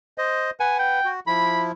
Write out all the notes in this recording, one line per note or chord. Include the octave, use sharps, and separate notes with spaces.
C5 D#5
B4 F#5 G#5
G5
F#4
F3 E4 B5